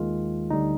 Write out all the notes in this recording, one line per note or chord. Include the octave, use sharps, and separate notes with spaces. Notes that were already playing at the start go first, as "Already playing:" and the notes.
Already playing: D#2 D#3 G#3 F4
D2 D3 G3 D#4